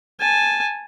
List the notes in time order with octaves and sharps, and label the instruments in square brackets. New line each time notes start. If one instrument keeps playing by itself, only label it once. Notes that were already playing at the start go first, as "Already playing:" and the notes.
[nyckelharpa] G#5 A5